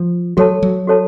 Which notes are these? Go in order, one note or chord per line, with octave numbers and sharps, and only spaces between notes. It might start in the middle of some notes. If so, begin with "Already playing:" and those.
Already playing: F3
F#3 F#4 A4 C#5 A5
F#3
F#4 A4 C#5 A5